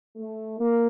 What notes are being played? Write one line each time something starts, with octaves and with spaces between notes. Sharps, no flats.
A3
A#3